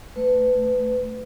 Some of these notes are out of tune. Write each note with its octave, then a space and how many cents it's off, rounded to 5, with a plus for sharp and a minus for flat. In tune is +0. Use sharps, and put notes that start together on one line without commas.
A3 -5 B4 +25